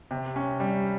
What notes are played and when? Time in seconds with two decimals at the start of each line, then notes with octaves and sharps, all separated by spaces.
0.11 C3
0.36 C#4
0.60 G3